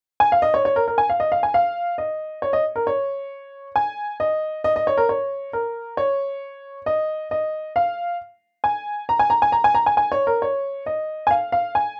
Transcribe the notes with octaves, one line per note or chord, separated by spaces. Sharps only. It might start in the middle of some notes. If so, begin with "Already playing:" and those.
G#5
F5
D#5
C#5
C#5
A#4
A#4
G#5
F5
D#5
F5
G#5
F5
D#5
C#5
D#5
A#4
C#5
G#5
D#5
D#5
D#5
C#5
A#4
C#5
A#4
C#5
D#5
D#5
F5
G#5
A#5
G#5
A#5
G#5
A#5
G#5
A#5
G#5
G#5
C#5
A#4
C#5
D#5
G#5
F5
F5
G#5